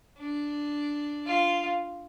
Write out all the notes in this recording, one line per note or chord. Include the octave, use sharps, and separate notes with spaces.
D4
F4